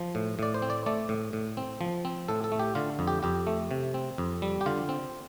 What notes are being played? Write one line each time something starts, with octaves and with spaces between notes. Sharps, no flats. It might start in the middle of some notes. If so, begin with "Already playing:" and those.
Already playing: F3
A2
A2 D5
C5
C4
D5
A3 D5
A2
A2
C4
F3
C4
A2 A4
A4
A3
G4
D3 F4
F2
G4
F2 G4
A3
C3
C4
F2
G3
G4
D3 F4
C4